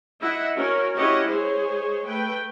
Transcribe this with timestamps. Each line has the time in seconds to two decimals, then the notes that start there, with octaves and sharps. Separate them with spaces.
0.21 E4 D#5 E5 F#5
0.55 C#4 F#4 A#4
0.95 C#4 E4 G4 D#5 F#5
1.30 G#3 G#4 C5 C#5
2.07 A3 B4 G5